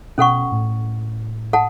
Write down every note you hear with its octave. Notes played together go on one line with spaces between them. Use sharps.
B2 C#4 A4 F#5 C#6
A2
A4 F#5 A5